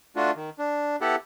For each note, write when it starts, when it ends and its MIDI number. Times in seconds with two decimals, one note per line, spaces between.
0.16 0.31 57
0.16 0.31 62
0.16 0.31 65
0.16 0.31 66
0.36 0.50 51
0.59 0.96 62
1.01 1.16 59
1.01 1.16 64
1.01 1.16 67
1.01 1.16 69
1.01 1.16 78